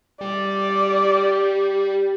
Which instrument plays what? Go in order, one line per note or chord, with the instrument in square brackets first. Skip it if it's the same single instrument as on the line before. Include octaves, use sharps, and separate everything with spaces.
[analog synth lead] G3 [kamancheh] D5